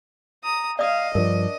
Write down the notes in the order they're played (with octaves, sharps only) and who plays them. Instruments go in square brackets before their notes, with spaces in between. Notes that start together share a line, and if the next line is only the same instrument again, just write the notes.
[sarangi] A#5 [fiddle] D#6
[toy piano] D5 D#6 [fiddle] D#5 [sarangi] F5
[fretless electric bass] G2 F3 [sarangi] D4 [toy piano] A#4